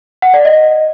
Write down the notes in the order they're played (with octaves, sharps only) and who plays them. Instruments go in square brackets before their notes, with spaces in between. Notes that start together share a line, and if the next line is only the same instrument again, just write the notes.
[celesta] F#5
D5
D#5